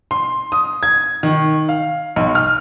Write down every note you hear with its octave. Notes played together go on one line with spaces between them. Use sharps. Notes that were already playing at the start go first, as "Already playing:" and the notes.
C6
D#6
G#6
D#3
F5
B1
F6